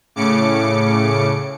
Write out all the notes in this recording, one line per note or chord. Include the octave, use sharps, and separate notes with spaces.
A2 C#3 D6 C#7